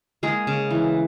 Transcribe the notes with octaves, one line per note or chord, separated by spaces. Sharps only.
G#3 A#3 G#4
C#3
E3